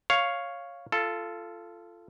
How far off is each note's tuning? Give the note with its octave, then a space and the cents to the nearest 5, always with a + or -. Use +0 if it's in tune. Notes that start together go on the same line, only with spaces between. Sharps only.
C#5 +0 F5 +0
F4 -20 A4 +0